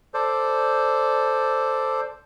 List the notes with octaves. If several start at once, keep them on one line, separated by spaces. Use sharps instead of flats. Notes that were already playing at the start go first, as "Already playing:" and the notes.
A4 C5 D5